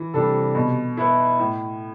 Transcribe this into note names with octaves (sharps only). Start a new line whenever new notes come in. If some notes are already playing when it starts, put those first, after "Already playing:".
Already playing: E3
C3 G3 D4 A4
B2
B3 E4
A2